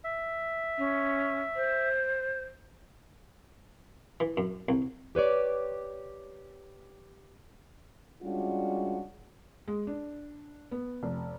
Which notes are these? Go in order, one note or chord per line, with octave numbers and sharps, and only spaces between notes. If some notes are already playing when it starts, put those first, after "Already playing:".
E5
C#4
C5
E3
F#2
C2
G4 B4 C#5 D5
G3 G#3 C#4 D4 F4 F#4
G#3
D4
B3
F1